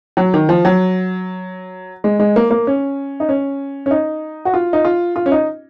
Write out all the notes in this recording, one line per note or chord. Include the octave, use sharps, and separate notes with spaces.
F#3
D#3
F3
F#3
G#3
G#3
A#3
A#3
C#4
D#4
C#4
C#4
D#4
F#4
F4
D#4
F4
F4
C#4
D#4